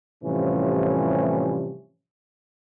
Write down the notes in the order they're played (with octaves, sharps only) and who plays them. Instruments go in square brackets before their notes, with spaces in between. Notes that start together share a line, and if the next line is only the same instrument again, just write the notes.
[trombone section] A2 C3 E3 F3 G3 C#4